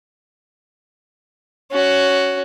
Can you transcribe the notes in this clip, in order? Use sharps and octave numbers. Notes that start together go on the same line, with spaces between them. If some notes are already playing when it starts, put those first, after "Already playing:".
C#4 F#4